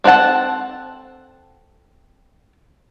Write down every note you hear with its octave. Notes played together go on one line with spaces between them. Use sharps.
C4 D4 A4 F#5 A5